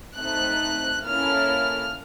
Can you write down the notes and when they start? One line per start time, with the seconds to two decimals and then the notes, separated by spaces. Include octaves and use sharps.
0.18 A3 C4 D#4 F#6
1.06 A#3 C#4 E4 A4 F6